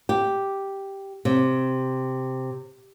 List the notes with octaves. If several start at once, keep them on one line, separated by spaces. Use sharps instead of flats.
G4
C3